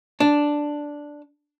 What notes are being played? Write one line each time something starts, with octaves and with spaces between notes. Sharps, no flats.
D4